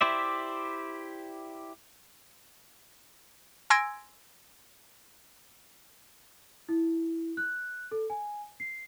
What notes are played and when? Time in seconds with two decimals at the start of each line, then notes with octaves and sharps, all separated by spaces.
0.01 E4 G4 C5 D5 E5
3.70 G#5 C6 E6 G#6 A#6 D7
6.69 E4
7.37 F#6
7.92 A4
8.10 G#5
8.60 C7